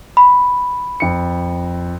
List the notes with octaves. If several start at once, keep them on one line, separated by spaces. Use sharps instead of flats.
B5
F2 C#7